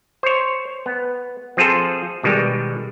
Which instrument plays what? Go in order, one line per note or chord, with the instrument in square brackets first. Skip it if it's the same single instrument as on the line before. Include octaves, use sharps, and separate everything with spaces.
[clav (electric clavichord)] C5 C#5
B3
F3 C4 F4 G#4 A4 C5
B2 D#3 G3 G#3